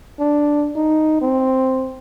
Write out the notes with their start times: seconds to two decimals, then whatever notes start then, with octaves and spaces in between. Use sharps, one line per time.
0.20 D4
0.76 D#4
1.21 C4